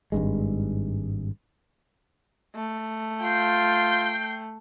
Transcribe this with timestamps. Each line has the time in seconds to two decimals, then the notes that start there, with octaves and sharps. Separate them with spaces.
0.12 G#1 G2 G#3
2.55 A3
3.21 F4 G5 G6 C7